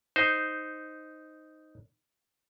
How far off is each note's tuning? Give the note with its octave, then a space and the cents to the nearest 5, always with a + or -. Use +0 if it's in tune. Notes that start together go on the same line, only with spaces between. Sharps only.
D#4 +0 C5 -5